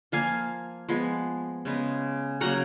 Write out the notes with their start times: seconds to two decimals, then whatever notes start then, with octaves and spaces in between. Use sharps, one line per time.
0.12 F3 A#3 F5 G#5
0.89 F3 G#3 B3
1.65 C#3 G#3 B3
2.40 C#3 F#3 A#3 F#5 A#5